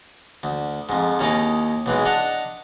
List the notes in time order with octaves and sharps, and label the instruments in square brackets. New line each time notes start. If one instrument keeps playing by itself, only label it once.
[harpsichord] D2
F2 G#2
D#2 C#4 D#4 E4 D#5 D6
B1 E3 G#3
D4 D#5 F#5 A5 A#5